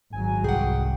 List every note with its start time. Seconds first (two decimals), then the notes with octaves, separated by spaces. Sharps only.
0.13 G#1 F#3 G#5
0.44 C2 G#4 F#5 G5